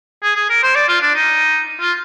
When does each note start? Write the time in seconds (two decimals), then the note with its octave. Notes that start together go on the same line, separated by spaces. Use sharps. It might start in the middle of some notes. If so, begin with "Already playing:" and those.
0.23 G#4
0.36 G#4
0.50 A#4
0.63 C5
0.75 D5
0.88 F4
1.01 D4
1.15 D#4
1.80 F4